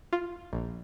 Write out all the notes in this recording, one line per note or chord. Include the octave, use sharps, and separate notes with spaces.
F4
A#1